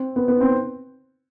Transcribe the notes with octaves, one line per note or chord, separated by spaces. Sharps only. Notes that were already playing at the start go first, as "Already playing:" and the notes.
Already playing: C4
B3
B3
C4